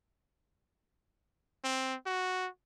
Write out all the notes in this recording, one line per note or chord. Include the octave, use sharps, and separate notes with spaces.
C4
F#4